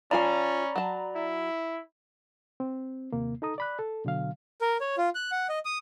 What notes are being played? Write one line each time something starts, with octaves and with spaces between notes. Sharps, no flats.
F3 C#4 F4 D5 G#5 A#5 B5
F#3 A5
E4
C4
D#2 C3 A#3
D#4 A4 A#5 D#6
D5 B5 F#6
A4
B2 D3 F#3 F5
A#4
C#5
F4
F#6
F#5
D#5
D#6